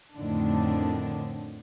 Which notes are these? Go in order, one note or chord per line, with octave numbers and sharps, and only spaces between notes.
F2 A2 D3 D#3 D4